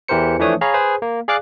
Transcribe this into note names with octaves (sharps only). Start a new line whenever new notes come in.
E2 E3 G4 A#4 C5 C#7
E3 F3 A3 D4 C#5 D#6
G#4 C#5 F5 A#5 B5
G#4 B4 C5
A#3
G#4 D5 F5 D6 F#6